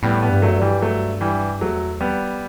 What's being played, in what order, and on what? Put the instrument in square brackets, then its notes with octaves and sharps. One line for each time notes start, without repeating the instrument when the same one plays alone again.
[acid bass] A2 [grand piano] G3 B3
[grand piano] G3 B3
[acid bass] G2
[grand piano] F#3 A3
[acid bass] F#2
G2
[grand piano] E3 G3
F#3 A3
E3 G3
[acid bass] E2 [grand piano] F#3 A3
[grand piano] G3 B3